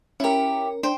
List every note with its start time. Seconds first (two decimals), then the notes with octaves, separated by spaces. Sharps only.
0.20 C#4 E4 G4 A#4
0.83 D4 C5 G5